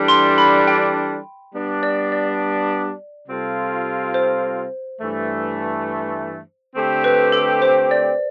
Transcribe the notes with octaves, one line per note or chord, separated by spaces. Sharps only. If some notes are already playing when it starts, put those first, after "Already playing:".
Already playing: E3 G3 D4 A4
C6
B5
G5
G3 B3 D4
D5
D5
C3 G3 C4 F4 A4
C5
G2 E3 A3
D3 A3 C4 G4
B4
A4
C5
D5